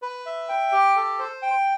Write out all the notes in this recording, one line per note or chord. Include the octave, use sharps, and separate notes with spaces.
B4
E5
G5
G4
A4
C5
G5